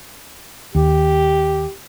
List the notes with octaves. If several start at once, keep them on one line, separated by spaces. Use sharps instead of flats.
D#2 G4